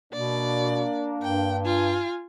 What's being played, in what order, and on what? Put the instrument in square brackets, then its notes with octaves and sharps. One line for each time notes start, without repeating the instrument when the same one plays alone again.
[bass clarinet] B2 [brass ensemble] A#3 D4 [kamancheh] D5
[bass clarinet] G2 [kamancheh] G5
[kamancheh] F4 G#5